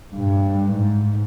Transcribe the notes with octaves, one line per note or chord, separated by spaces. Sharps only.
G2
G#2